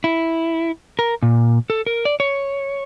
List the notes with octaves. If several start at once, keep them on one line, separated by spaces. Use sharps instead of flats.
E4
A#4
A#2
A4
A#4
D5
C#5